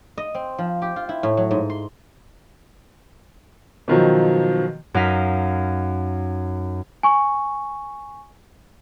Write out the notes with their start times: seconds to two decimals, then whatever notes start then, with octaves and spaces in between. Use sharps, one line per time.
0.18 D#5
0.35 C4
0.58 F3
0.82 G4
0.96 F4
1.09 E4
1.23 A2
1.37 F#3
1.51 G#2
1.70 C6
3.88 B2 D#3 F3 F#3
4.94 F#2 D#4 F5 B6
7.03 G#5 C#6